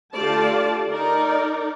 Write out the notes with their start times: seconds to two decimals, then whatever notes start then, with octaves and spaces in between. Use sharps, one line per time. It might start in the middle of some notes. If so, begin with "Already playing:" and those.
0.14 D3 A3 F4 G4 D5 A5
0.92 D#4 A#4 D5